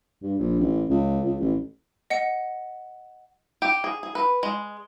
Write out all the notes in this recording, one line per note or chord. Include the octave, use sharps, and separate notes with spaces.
G2
A#1
A1
C#2
C#2
A1
D#5 F#5 C#7
G4
G#4
G#4
B4
G#3